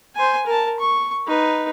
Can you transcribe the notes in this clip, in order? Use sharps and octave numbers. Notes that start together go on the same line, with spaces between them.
C5 G#5
A#4 A5
C#6
D#4 B4